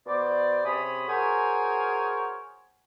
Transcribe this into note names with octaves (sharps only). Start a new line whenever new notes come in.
B2 B3 C5 D5
C3 C#4 G#4 C#5 B5 D#6
F#4 G#4 A#4 C5 C#5 G#5